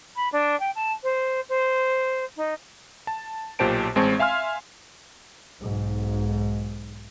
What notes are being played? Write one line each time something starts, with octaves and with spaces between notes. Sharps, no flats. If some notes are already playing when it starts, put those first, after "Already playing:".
B5
D4
G5
A5
C5
C5
D#4
A5
B1 A#2 G4 C5 A5 D7
A1 G#3 C4 A5 C#6 G#6
E5 F5 G#5 C6 F6
B1 G#2